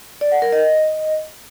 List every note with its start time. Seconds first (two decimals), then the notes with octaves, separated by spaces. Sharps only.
0.21 D5
0.32 F#5
0.42 A#4
0.52 D#5